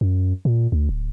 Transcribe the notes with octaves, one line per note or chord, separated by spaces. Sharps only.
F#2
A#2
D2
D1